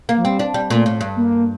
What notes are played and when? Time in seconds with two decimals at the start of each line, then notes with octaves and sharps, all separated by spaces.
0.09 A#3
0.17 F3
0.25 G3 C4
0.39 D4
0.54 G3
0.70 A#2 A3
0.86 A2
1.01 G2
1.16 A#3